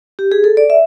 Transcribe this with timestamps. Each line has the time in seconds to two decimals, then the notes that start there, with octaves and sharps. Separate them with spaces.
0.19 G4
0.32 G#4
0.44 A4
0.57 D5
0.70 E5